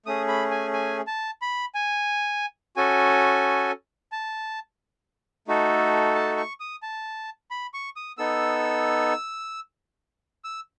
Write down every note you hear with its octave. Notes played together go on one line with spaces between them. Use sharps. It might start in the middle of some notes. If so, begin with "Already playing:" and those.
A3 C#4 G#4 D#6
B5
G#5
G#5
A5
B5
G#5
C#4 F#4 A4 G#5
A5
A3 D#4 F#4 A4
A5
C#6
D#6
A5
B5
C#6
D#6
B3 D#4 A4 E6
E6